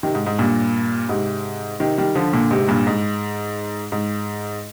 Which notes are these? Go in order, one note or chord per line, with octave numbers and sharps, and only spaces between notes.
C3 D#3
G#2
G#2
G2 A#2
G#2 C3
C3 D#3
D#3 G3
D3 F3
A#2 D3
G#2 C3
G2 A#2
G#2
G#2